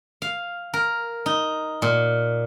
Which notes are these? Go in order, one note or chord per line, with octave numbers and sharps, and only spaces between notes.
F5
A#4
D#4
A#2